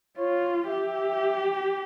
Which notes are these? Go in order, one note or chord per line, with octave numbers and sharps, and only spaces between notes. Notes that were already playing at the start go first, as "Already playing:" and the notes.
F4 C#5
G4 E5